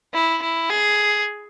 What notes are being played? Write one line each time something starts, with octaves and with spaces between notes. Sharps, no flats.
E4
E4
G#4